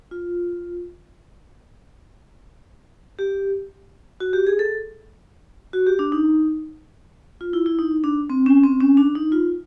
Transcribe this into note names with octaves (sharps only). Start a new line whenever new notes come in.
F4
G4
F#4
G4
G#4
A4
F#4
G4
D4
D#4
F4
E4
E4
D#4
D4
C4
C#4
C4
C#4
D4
D#4
F4